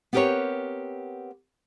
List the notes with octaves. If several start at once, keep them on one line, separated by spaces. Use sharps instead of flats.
B3 C4 G4 A#4 B4 C#5